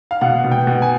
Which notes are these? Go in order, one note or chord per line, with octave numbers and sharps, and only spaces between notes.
F5
B2 F#5
B2
G5
B2
G#5